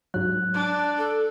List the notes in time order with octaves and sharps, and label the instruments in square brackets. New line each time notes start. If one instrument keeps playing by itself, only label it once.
[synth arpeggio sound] G#2 F#3 [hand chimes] F#6
[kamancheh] D4
[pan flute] A4